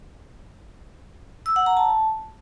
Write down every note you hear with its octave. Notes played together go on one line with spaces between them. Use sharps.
E6
F#5
A#5
A5